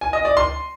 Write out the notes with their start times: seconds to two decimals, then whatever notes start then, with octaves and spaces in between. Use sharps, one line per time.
0.01 G#5
0.13 D#5
0.25 D5
0.37 C6